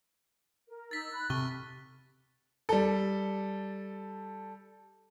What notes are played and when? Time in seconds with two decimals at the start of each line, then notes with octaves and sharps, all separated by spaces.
0.68 A#4
0.91 D#4 E6 A6 B6
1.12 B5 F#6
1.30 C3 A4 C#6 F6 G7
2.69 G3 A4